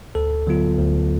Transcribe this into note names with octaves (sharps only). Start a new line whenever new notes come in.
D2 A4
D3 F#3 B3 F4
D2